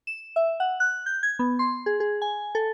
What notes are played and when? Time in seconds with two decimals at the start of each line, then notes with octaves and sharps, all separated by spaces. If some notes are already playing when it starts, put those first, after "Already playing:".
0.07 E7
0.36 E5
0.60 F#5
0.80 F#6
1.06 G6
1.23 G#6
1.39 B3
1.59 C6
1.86 G#4
2.00 G#4
2.22 G#5
2.55 A4